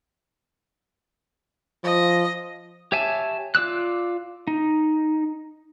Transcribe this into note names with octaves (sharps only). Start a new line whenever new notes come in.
F3 D#5
G4 C#5 E5 G#5 A5
F4 D5 E6 F#6
D#4